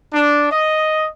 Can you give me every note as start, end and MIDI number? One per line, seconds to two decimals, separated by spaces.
0.14 0.47 62
0.50 1.07 75